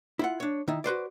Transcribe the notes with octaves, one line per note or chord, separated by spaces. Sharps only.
E4 F4 F#5
D4 C#5
D#3 D#4 E4
F#4 B4 C5 D5